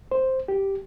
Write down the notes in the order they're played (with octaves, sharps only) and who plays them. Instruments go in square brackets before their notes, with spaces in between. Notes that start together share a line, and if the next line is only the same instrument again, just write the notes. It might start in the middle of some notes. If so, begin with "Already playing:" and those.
[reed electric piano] C5
G4